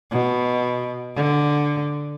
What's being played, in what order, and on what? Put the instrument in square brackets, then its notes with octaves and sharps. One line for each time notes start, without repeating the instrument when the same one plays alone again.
[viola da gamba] B2
D3